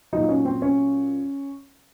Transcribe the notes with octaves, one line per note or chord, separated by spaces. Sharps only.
A#2 F#3 D#4
C#4
C4
C#4